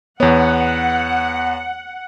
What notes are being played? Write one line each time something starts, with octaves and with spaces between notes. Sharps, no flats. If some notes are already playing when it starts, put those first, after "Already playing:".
E2 B3 C#5 F#5